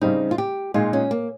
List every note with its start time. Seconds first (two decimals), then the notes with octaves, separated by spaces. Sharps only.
0.02 C#3 G3 C4 D#4
0.31 F4
0.38 G4
0.74 A#2 G#3 D#4 F4 G#4
0.93 C#4
1.11 A#3